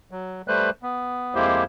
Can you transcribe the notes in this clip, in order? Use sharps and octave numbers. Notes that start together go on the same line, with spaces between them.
F#3
G3 A3 B4 C5 F#6
B3
F2 G#3 A#3 E4 G4 C5